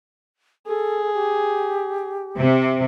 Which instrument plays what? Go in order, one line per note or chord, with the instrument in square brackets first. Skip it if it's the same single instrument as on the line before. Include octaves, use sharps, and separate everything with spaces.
[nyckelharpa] G#4 [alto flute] A4
[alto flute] G4
[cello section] C3 [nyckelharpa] E5